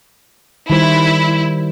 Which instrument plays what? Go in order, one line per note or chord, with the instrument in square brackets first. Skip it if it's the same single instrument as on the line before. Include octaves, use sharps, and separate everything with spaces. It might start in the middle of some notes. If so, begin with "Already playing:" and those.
[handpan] D#3 G3 C5 [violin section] E4